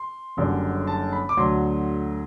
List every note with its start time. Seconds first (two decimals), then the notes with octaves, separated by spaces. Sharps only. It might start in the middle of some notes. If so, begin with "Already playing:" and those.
Already playing: C6
0.37 F#1 F#2 D3 G3
0.87 A5
1.13 B5
1.29 D6
1.37 D2 D3 F#3 C6